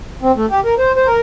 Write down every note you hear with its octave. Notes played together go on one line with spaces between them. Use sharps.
C4
A3
G4
A#4
C5
C5
A#4